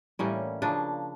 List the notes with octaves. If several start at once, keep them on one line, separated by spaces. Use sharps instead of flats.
A2 E3 G3 A#3 C#4
C#3 F3 A#3 D4